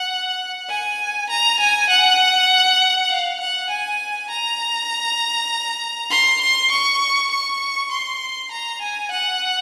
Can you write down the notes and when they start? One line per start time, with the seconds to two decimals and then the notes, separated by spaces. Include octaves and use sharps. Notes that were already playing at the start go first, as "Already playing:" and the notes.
Already playing: F#5
0.69 G#5
1.29 A#5
1.60 G#5
1.89 F#5
3.10 F5
3.40 F#5
3.70 G#5
4.30 A#5
6.10 C6
6.41 C6
6.71 C#6
7.31 C#6
7.91 C6
8.51 A#5
8.81 G#5
9.11 F#5